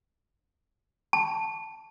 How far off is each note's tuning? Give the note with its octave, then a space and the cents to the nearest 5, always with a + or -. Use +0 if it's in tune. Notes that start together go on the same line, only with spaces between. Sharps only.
A5 +0